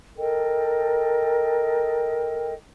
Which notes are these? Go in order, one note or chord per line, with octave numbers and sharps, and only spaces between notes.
A4 A#4 D#5 G5